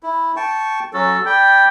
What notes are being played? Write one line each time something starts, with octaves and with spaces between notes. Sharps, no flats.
E4
G5 A5 C#6
F#3 C#4 F#4 A4
D5 G5 B5